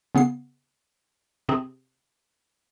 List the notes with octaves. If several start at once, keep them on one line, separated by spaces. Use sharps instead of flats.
C#3 B3 G#4 C7
C3 C4 G#4